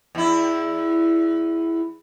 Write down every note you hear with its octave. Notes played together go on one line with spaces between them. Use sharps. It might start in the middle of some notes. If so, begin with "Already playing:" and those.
E2 E4